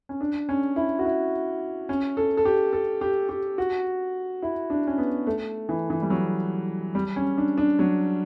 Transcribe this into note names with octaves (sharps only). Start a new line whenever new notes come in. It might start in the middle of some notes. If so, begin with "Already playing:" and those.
C#4
D4
C#4
E4
F#4
E4
C#4
A4
A4
G4
A4
G4
G4
F#4
E4
D4
C#4
B3
A3
E3
E3
G3
F#3
G3
C#4
D4
D4
F#3